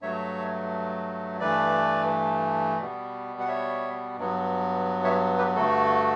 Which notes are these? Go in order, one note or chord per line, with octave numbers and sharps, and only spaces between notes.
G2 F#3 A3 C#5 E5
G2 E3 A3 B4 D5
B2 G3 B3
F#5
C#5 E5
G2 F#3 B3
C#5 E5
G4 B4
G2 D3 A3 F#4 A4